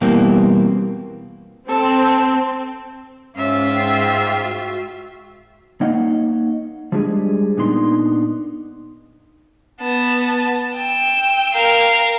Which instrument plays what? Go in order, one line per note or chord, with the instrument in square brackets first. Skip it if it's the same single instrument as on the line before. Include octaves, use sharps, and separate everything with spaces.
[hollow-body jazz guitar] B2 E3 G3 A#3 C4
[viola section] C4 [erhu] A4
[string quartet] G#2 F4 E5 [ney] C#4
[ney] G5
F#4
[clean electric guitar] A#3 D#4 C#5 D#5 F5 F#5
F3 G3 G#3 D4 G#4
A#2 B3 D4 D#4 B4 C6
[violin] B3 A5
G5 E6
[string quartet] A#4 F5